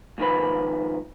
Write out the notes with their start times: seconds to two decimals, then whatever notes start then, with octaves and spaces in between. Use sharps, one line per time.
0.18 G#2 D#3 F3 B4 B5